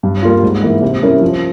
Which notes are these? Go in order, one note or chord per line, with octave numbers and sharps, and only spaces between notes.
G2
G3 A#3 F4
G#2
E3 A#3
C3
G3 C#4 E4 A#4
F3